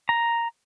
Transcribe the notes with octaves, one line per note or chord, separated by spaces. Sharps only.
A#5